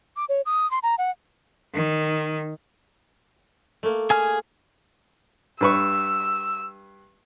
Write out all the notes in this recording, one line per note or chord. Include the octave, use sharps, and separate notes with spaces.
D6
C#5
D#6
C6
A#5
F#5
D#3
A3 A#3
G#4 G#5 F6
G2 B4 C#6 E6